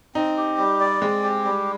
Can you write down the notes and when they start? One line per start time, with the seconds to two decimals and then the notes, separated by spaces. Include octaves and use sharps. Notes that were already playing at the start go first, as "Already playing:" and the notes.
0.15 C4 D#4
0.37 G4
0.58 G3
0.80 D5
1.02 G#3 C4
1.23 G4
1.45 G3